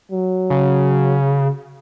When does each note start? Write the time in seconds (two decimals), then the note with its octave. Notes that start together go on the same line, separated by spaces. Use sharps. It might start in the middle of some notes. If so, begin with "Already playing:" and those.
0.12 F#3
0.50 C#3